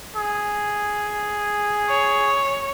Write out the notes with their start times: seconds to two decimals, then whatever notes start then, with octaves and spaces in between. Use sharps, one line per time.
0.16 G#4
1.89 C#5